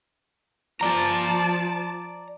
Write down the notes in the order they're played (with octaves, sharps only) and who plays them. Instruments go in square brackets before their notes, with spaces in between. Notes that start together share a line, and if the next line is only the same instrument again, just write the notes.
[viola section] F3 A5 [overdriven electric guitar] D5 A#5